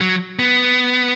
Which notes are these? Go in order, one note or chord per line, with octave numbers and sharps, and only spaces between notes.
F#3
B3